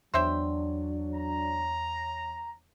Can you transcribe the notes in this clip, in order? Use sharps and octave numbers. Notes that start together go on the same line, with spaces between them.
E2 F#3 D4 C5 C#5 E5 G5
A#5